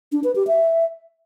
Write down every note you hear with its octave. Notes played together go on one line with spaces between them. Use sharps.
D4
B4
G4
E5